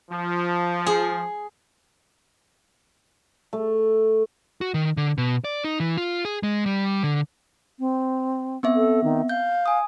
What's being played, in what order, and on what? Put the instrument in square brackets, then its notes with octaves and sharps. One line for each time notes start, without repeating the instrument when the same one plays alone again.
[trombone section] F3
[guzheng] G#4
[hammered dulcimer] A3
[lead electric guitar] F#4
D#3
D3
B2
D5
D#4
E3
F4
G#4
G#3
G3
D3
[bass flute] C4
[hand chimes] B3 C4 E5
[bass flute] A4
D#3
[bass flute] F5 [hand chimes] G6
[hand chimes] G#5 D#6